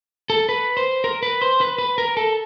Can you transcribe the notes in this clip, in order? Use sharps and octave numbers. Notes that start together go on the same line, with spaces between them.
A4
B4
C5
A#4
B4
C5
B4
B4
A#4
A4